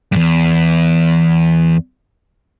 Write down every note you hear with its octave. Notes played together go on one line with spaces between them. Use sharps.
E2 G2